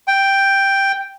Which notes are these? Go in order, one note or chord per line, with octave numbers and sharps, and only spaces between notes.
G5